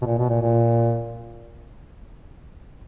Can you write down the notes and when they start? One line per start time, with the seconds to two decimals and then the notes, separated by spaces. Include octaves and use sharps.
0.02 B2
0.06 A#2
0.18 B2
0.29 A#2
0.42 A#2